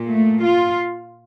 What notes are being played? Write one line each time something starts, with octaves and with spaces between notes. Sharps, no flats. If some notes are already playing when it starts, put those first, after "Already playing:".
Already playing: A#2
A3
F4